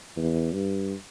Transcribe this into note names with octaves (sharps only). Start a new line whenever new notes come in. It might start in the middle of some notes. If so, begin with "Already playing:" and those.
E2
G2